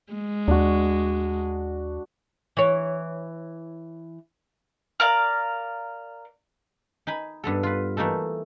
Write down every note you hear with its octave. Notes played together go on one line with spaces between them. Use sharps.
G#3
D#2 D4 F#4
E3 C#5
A#4 D5 F5
D#4 G#5 B5
G2 B3 A4
F4 B4
E3 A3 A#3 D#4 A4